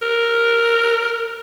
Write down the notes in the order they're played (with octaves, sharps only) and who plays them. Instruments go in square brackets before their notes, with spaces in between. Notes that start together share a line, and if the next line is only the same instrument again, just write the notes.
[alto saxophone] A#4